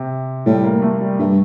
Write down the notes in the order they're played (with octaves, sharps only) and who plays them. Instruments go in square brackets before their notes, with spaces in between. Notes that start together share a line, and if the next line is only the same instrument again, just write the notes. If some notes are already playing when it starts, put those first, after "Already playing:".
Already playing: [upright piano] C3
[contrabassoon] A2 [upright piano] G3
[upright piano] A#3
A3
G3
[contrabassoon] G2 [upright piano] A3